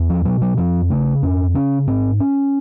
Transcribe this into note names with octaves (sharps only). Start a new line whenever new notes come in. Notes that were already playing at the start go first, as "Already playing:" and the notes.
Already playing: E2
F3
B2 F#3
F#3
F2 F3
C#3 A3
F2 C#4
C#3 C#4
G#2 C4
C#4